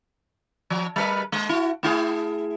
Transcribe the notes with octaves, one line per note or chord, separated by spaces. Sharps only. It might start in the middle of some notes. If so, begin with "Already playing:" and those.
F3
G3 A#4 B4
G#3
E4 F#4
A3 E4 G#4